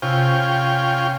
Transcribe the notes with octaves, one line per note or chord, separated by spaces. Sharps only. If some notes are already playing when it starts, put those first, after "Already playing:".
C3 C#4 F4 G5